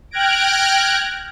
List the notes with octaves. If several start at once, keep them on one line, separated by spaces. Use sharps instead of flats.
G5 F6 F#6 G#6 A#6 D7